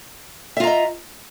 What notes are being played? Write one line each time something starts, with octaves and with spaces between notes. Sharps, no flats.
F4 D#5 E5 A#5